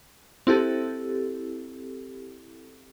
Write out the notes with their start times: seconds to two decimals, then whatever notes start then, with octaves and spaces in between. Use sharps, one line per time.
0.47 C4 E4 G4 A4